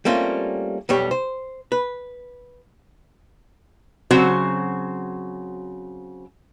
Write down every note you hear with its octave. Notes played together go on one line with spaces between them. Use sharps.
G3 A3 A#3 C4 C#4 F4
B1 F2 G3 G4 C#5
C5
B4
C#3 F#3 C4 F#4 C5